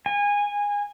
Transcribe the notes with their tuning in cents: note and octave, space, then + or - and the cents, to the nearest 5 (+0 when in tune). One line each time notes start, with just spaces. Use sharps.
G#5 -20